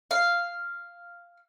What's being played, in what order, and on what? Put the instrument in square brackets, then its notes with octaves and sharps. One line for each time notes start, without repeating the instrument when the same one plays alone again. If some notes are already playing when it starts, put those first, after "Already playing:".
[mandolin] F5